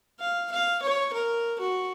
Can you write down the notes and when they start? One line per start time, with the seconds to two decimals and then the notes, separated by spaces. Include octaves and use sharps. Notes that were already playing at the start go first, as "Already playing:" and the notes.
0.20 F5
0.51 F5
0.82 C#5
1.14 A#4
1.60 F#4